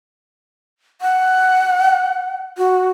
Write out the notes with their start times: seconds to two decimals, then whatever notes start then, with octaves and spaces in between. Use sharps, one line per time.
1.01 F#5
2.58 F#4